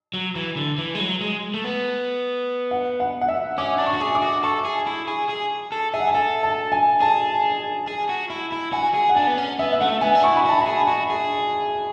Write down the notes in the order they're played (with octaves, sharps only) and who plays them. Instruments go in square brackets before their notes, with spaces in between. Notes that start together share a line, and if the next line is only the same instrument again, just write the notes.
[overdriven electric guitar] F#3
E3
D3
E3
G#3
F#3
G#3
A3
B3
[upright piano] F#5
F#5
F#5
E5
[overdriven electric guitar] C#4 [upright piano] D6
[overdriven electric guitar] D4
[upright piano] C#6
[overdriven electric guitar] F#4
G#4
[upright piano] D6
[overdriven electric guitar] F#4
[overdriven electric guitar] A4 [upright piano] C#6
[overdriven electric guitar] G#4
E4
G#4
G#4
A4
[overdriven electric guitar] G#4 [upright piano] E5
[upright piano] F#5
G#5
[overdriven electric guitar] A4 [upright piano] A5
[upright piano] A5
G#5
[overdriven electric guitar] G#4 [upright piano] A5
[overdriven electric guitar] G#4
F#4
E4
E4
[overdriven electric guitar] F#4 [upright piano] G#5
[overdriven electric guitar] G#4
[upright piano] F#5
[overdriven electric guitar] D4 [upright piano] G#5
[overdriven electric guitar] B3
C#4
[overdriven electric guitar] B3 [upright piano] E5
[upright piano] E5
[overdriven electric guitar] A3 [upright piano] F#5
[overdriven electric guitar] B3 [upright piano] G#5
[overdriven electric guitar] D4
[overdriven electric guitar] E4 [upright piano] C#6
[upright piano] B5
[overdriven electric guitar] F#4 [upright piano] A5
[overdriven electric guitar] G#4 [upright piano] B5
[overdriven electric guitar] F#4
G#4